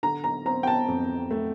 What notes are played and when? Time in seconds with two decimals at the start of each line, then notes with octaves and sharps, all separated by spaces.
0.03 D3 A#5
0.24 A#5
0.45 C4 A#5
0.63 G5
0.67 A5
0.88 F2
1.31 A3